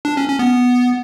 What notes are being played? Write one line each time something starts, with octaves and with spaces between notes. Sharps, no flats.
D4
C#4
C#4
B3